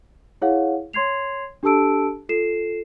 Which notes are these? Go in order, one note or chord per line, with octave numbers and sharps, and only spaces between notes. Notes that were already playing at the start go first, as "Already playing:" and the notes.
E4 G#4 C#5 F5 F#5
C#5 C6 G#6 C7 F7
D4 G4 A4 A5 E6 D7
F4 A4 C7 E7